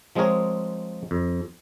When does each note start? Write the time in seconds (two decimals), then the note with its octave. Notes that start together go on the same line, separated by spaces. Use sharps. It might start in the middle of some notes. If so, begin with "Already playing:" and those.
0.16 F3 G#3 C4 G#4 A#4 C#5
1.11 F2